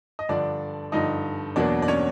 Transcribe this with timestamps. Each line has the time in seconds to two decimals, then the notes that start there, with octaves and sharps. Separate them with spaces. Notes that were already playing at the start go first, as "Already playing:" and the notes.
0.19 D#5
0.29 G2 D3 F3 D4 D5
0.92 G2 D3 F3 D#4 D#5
1.56 E2 B2 F#3 A#3 D4 D5
1.82 D5
1.88 C#4 C#5